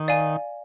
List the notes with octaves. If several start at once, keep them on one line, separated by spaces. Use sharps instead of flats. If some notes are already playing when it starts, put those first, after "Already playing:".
Already playing: D#3
D5 F5 G#5